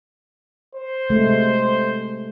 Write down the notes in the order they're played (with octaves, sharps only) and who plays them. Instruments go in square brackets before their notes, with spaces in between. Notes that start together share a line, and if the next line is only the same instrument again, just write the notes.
[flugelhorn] C5
[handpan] C3 G#3 A3